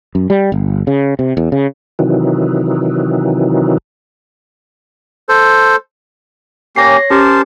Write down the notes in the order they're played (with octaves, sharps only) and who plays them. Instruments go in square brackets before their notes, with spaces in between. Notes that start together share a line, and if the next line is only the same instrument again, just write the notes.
[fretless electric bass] F#2
G3
G1
C#3
C3
E2
C#3
[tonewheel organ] C3 D#3 E3 F#3
[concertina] A4 C5
[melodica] A#3 C#4 G4 [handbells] C#5 A#6 C7
[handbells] C#4 G4 [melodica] A#4 C5 A5